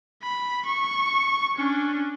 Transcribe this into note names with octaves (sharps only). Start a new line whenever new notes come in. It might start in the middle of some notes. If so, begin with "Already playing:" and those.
B5
C#6
C#4 D4